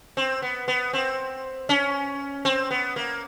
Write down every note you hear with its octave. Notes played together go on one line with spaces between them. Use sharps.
C4
B3
B3
C4
C#4
C4
B3
A#3